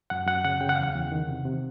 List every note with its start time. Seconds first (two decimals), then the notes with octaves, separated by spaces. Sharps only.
0.10 F#2 F#5
0.27 F#2 F#5
0.45 C#3 F#5
0.61 C#3 G5
0.69 F#5
0.76 F5
0.78 E2
0.83 F#5
0.95 E2
1.12 D#3
1.28 C3
1.45 C3